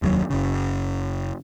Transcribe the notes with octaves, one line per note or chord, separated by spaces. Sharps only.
F1 D#2 B2 F#3
F#1 C#3